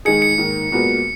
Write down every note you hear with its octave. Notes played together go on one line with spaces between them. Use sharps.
D#3 G#3 D#4 G#4 C#7
C#7
G#2 D#3 A#3
A#2 G#3 B3 F#4 A#4